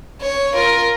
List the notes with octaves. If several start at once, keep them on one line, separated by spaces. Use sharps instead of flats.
C#5
F4 A#4